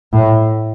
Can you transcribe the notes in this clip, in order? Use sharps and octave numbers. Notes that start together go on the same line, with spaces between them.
A2